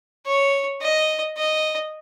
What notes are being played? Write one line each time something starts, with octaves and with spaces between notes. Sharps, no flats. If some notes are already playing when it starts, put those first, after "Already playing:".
C#5
D#5
D#5